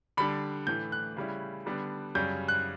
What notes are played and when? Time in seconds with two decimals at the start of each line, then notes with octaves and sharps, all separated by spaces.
0.17 D3 G3 D4 B5
0.67 A2 E3 A3 G6
0.92 F#6
1.17 C#3 G3 C#4 E4
1.66 D3 G3 B3 D4
2.15 F#2 C#3 G3 C#4 G6
2.48 F#6